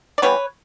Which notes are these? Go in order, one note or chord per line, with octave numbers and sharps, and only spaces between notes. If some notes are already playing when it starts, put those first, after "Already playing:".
D5
E3 G3 B3 B4 C#5